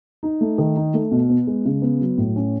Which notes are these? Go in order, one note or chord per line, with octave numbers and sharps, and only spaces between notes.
D#4
A3
D#3
D#4
A3
B2
B3
G#3
C#3
B3
F#3
A2
C#4